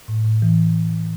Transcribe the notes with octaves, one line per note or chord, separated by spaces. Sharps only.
A2
A2
E3